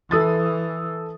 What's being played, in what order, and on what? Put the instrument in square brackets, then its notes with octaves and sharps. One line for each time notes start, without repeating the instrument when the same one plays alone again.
[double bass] E3 [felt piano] A4 D#6 A6